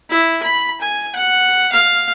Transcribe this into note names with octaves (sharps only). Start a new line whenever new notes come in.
E4
B5
G#5
F#5
F5